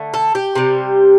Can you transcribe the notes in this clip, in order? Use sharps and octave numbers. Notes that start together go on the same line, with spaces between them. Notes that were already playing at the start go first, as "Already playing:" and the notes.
Already playing: D3 A3
A4
G4
C3 G3